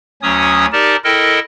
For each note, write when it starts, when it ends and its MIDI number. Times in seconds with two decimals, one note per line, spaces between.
0.22 0.66 38
0.22 0.66 54
0.22 0.66 61
0.22 0.66 73
0.22 0.66 87
0.73 0.96 63
0.73 0.96 67
0.73 0.96 70
0.73 0.96 74
0.73 0.96 81
1.04 1.39 64
1.04 1.39 69
1.04 1.39 70
1.04 1.39 75
1.04 1.39 79